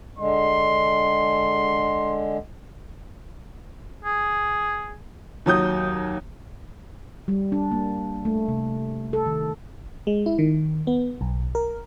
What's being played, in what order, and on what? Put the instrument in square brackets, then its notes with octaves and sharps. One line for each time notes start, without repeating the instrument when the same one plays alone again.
[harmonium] D3 G#3 [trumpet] C6
[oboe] G#4
[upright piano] D#2 F#3 D#6 G6
[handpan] G3
D4
A#3
A3
C3
A4
D#3
[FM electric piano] G#3
E4
D#3
B3
B1
A#4